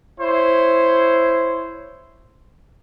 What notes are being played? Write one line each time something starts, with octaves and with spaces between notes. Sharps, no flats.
E4 C5 C#5